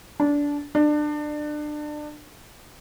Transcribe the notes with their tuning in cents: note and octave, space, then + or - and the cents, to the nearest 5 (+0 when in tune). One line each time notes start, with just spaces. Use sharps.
D4 -20
D4 +25